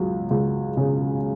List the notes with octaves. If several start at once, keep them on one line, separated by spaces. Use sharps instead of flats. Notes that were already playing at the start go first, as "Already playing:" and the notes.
Already playing: C#2 F#3
C#2
C#3